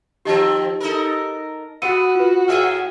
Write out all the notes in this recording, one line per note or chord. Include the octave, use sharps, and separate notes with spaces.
D#3 F3 C4 G4 D#5 A5
D#4 A4 A#4
B3 F#4 E6 C#7 D#7
F4 B4
A2 G#4 E5 F6 D#7